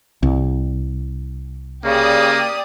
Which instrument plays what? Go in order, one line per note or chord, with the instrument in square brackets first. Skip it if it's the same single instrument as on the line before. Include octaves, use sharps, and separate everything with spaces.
[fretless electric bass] C2
[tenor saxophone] C#3 [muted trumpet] A#3 [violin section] G4 D5 D#6